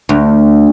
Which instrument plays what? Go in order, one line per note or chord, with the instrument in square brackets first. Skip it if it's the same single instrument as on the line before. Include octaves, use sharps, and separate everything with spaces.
[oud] D2